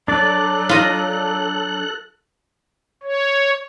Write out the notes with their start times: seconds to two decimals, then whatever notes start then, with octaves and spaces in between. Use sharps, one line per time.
0.08 F#3 D4 A4 D5 F#6
0.69 F4 D#5
3.03 C#5